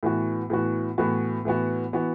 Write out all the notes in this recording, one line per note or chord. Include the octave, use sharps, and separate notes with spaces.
A2 E3 B3 F#4
A2 E3 B3 F#4
A2 E3 B3 F#4
A2 E3 B3 F#4
E3 B3 F#4